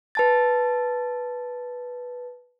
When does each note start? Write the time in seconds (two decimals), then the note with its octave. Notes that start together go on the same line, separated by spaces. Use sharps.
0.15 B4 A5 A6